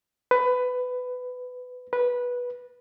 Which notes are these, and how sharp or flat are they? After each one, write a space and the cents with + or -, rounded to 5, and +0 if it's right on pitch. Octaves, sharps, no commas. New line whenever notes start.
B4 +20
B4 -10